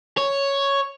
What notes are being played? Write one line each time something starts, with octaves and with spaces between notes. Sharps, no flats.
C#5